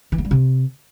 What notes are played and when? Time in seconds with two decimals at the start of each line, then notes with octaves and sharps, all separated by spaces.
0.12 E3
0.18 B3
0.25 G3
0.31 C3